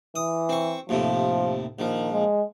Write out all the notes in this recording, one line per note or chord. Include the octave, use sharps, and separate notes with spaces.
E3 D#6
C4 C#6
D#2 A2 C3 F3
A#1 D#3 F3
G#3